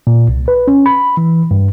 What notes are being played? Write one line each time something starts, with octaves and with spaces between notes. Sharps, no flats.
A#2
C2
B4
C#4
B5
E3
G2